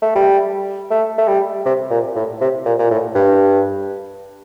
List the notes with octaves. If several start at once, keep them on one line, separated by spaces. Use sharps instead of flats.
A3
G3
A3
A3
G3
C3
A#2
A2
C3
A#2
A#2
A2
G2